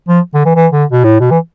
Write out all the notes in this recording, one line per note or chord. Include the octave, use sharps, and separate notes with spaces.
F3
D3
E3
E3
D3
B2
A2
B2
E3